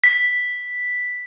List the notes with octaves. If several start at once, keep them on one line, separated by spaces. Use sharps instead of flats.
B6